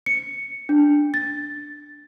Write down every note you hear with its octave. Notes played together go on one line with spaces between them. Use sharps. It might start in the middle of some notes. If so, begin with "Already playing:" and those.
C#7
D4
A6